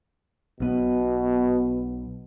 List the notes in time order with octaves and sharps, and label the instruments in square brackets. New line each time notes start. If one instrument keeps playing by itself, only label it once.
[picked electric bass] B1 B3 [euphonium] B2